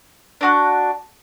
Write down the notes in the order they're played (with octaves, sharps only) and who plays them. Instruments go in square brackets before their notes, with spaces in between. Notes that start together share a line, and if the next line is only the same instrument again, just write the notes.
[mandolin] D4 F#4 F#6